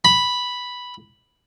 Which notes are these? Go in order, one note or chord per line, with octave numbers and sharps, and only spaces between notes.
B5